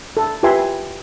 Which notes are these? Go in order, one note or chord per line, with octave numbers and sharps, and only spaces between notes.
A4
F4 G4 B4 E5 G#5 C6